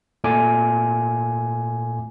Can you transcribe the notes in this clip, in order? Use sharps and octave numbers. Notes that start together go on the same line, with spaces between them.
A#2 A3 G#5 D6